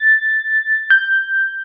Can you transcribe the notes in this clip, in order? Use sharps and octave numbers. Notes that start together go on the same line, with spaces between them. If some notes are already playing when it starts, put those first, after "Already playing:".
Already playing: A6
G6